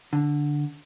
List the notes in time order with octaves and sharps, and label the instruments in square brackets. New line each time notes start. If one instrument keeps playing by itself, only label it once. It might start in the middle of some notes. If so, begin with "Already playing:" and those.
[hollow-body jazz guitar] D3